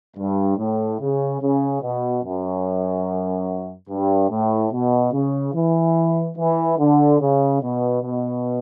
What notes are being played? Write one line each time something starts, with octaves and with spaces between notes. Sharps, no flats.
G2
A2
C#3
C#3
B2
F#2
G2
A2
B2
C#3
E3
E3
D3
C#3
B2
B2